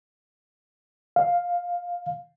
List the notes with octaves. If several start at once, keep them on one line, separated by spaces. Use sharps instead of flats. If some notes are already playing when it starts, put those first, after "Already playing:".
F5